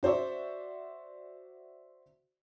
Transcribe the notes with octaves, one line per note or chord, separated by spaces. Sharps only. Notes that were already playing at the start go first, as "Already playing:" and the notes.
F#4 C5 D5 E5 C#6